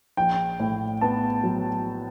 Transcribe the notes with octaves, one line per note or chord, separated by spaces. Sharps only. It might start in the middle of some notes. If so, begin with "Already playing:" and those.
A#1 G5
A2
B3 A5
F#3